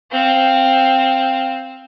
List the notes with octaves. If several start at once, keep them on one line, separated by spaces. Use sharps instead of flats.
C4 F5